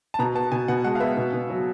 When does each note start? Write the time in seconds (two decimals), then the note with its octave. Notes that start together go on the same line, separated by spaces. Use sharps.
0.14 A5
0.19 B2 A#5
0.35 B3 A5
0.52 B2 G#5
0.68 B2 F#5
0.84 G#3 F#5
0.95 F5
1.00 B3 E5
1.17 B2
1.33 B2
1.50 F#3